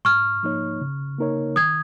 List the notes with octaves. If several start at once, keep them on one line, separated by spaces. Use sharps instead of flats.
G#2 C#6 F6
F3 A#3 D#4 C#5
C#3
A#3 D#4 A#4 C#5
D#3 D#6 G#6